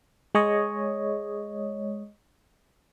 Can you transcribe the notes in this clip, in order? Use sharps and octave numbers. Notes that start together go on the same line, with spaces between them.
G#3 C#5 D#5